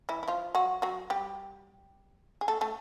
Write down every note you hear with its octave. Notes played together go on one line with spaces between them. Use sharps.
E3 E4
E4
F3 F4
F#3 F#4
F#3 F#4
G3 G4
G#4
A3 A4
A3 A4